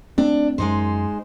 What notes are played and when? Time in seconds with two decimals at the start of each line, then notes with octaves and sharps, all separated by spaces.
0.18 A3 C4 D4
0.58 F#2 G#3 D#4 C5